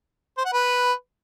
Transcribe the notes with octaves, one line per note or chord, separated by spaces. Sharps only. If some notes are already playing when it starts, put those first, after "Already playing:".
C5
F#5
B4